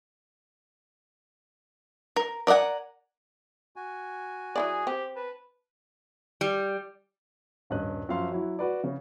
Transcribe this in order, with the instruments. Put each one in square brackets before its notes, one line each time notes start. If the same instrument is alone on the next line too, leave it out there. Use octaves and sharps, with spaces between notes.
[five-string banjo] A#4
A#4 D5 D#5 F#5 G#5
[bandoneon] F#4 G#5
[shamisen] F#3 E4 D5 [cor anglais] G#4
[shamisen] C4 [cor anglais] G4
[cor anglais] B4 [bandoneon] A5
[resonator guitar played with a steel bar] G3
[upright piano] D#1 G2 C#4 D#5 F#6
F#2 F3 F5 C6
F#3 E4
F#4 B4 D5
C#3 C#4